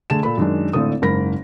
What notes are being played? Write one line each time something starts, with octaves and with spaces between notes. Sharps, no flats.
D3 A3 G#4 A5 E7
A#2 A4 B5
F#2 D#3 G#3 D4
G#1 A2 D3 A4 D#6
F#1 G#2 A#4 B5 A#6